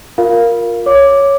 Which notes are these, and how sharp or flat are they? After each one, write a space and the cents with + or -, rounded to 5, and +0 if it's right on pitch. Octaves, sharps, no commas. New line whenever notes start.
F4 +15 A#4 +0 F5 -5
C#5 +0 D6 +0